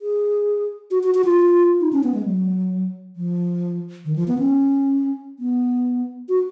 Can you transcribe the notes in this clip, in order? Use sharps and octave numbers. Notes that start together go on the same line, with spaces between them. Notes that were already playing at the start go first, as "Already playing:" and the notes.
G#4
F#4
F#4
F#4
F4
D#4
C#4
B3
G#3
F#3
F3
D#3
F3
B3
C#4
B3
F#4